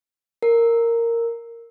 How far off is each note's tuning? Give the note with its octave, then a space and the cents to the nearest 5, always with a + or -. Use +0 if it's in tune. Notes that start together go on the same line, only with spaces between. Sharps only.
A#4 -10